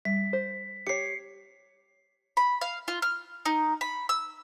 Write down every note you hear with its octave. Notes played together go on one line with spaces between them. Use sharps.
G3 B6
C5
G4 C#5 C7 C#7
B5
F5
F4
F6
D#4
B5
E6